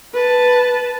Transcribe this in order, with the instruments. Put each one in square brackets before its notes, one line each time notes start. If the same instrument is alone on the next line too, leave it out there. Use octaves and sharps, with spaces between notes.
[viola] B4 A5